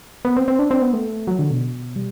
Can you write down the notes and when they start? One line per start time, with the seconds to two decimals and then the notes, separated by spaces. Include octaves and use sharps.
0.25 B3
0.36 C4
0.48 C4
0.59 D4
0.71 C4
0.82 B3
0.93 A3
1.27 F#3
1.39 D3
1.51 B2
1.96 G3